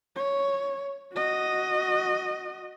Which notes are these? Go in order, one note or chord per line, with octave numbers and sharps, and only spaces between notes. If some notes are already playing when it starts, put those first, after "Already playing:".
C#5
F#4 D#5